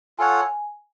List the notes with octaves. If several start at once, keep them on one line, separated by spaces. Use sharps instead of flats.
F4 A4 C#5 F#5 G#5